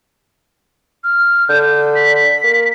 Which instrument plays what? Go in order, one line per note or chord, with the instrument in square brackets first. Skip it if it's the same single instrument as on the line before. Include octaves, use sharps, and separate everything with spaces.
[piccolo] F6
[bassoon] D3 [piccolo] G6
[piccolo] B6
[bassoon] A#3